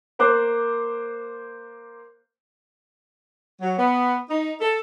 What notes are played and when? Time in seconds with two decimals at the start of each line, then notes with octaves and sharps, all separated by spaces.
0.19 A#3 C5 D6 F#6
3.61 F#3
3.78 B3
4.30 D#4
4.61 A4